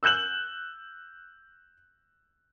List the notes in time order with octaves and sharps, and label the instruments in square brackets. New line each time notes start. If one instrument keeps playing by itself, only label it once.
[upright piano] E6 F#6 G6 E7 F#7